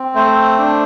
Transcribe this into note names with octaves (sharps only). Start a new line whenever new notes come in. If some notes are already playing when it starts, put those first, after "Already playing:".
Already playing: C4
A3 C5
D4